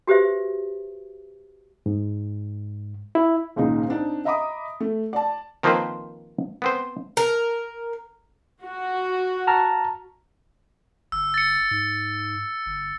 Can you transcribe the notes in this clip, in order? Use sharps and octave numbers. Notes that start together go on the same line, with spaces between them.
F#4 G4 B4 C5 E5
G#2
E4
G#1 C#2 A#2 D#4 G#4
C4 D4 D#4
D#5 E5 A#5 B5 D6 D#6
A3
D5 A5
D#3 F3 A#3 C4 B4 C5
B3 C4 C5
A#4
F#4
A5 A#5 F6
G1 E6
A6 C#7
G#2
G1